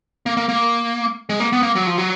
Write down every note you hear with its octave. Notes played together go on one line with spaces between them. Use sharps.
A#3
A#3
A#3
G#3
A#3
B3
A#3
F#3
F3
F#3